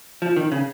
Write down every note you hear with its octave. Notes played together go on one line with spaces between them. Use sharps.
F3
D#3
C#3